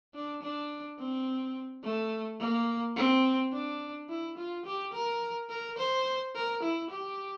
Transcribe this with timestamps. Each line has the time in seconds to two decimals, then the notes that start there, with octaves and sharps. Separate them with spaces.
0.14 D4
0.43 D4
0.99 C4
1.84 A3
2.40 A#3
2.96 C4
3.52 D4
4.09 E4
4.37 F4
4.65 G4
4.93 A#4
5.50 A#4
5.78 C5
6.35 A#4
6.63 E4
6.90 G4